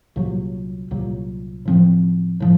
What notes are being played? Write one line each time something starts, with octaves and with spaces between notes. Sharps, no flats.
C2 A#2 F#3
C2 A#2 F#3
A2 F3 C4
A2 F3